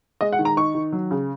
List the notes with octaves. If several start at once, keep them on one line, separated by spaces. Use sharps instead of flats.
G#3 D#5
F#5
D#3
A#5
D#4 C#6
D#3
F#3
C#3